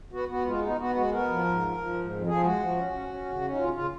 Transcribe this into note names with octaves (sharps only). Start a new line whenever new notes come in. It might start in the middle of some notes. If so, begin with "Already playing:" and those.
B3 F#4
B3 F#4
G#3 F4
B3 D#4
B3 F#4
G#3 F#4
B3 A#4
F3
G#2
F3
F3
G#2
F2
F3 G#4
G#3 F#4
F3
C#4
C#4
C#4
C#3
C#4
D#4
C#3 F4
C#3 F4